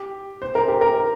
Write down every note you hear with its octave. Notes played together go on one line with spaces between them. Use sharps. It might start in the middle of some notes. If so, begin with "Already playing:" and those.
Already playing: G4
C5
A#4
G4
A#4